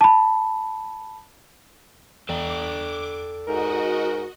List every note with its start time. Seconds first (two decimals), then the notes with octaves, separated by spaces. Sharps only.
0.01 A5 B5
2.29 E2 A4 D5 G5 D6
3.46 G#2 F#4 A#4 D#5